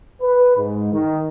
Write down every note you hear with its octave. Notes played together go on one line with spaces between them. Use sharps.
B4
G#2
D#3